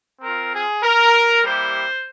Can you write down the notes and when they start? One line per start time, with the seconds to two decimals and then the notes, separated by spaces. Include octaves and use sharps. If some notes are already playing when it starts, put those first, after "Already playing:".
0.21 C4 F4 A#4
0.52 G#4
0.83 A#4
1.44 G3 A#3 E4 G4 C5